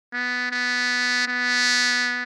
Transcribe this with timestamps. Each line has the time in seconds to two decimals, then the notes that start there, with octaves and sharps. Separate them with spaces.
0.13 B3
0.51 B3
1.28 B3